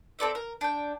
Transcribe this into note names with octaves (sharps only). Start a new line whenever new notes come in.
C4 A4 D5 E5
A#4
D4 G5